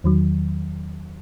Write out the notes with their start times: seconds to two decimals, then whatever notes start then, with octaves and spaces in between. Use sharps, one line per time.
0.04 E2 D#3 F#3